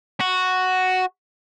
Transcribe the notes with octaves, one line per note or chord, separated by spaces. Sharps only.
F#4